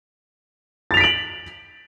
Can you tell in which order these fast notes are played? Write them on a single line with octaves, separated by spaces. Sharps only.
A6 F7 B6 D7 F#7